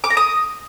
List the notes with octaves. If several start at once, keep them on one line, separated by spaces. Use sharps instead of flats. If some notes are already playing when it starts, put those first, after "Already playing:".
D6
A#5
D#6